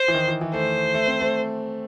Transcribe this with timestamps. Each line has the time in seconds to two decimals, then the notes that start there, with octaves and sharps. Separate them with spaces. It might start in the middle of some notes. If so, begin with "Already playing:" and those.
Already playing: C5
0.08 E3
0.14 D#3
0.28 E3
0.41 E3
0.53 A3 C5
0.94 A3
1.07 C4
1.21 A3